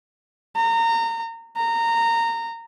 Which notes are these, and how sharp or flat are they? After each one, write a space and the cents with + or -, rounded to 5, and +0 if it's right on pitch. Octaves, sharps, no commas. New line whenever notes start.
A#5 -25
A#5 -20